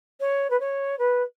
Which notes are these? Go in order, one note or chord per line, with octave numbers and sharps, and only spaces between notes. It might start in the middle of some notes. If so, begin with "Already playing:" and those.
C#5
B4
C#5
B4